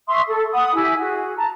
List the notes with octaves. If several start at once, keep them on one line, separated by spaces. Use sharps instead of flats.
E5 C6 C#6 D#6
A4
F#5 B5 D#6
E4 G4 G#5 E6
F#4 G#4
A5 A#5